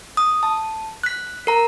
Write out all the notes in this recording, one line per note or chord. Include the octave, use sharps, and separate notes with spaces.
D#6
A5
F#6 B6
A#4 A#5